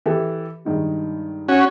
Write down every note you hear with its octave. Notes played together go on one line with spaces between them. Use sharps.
E3 G4 A4
G2 D#3 G#3
C#4 F#4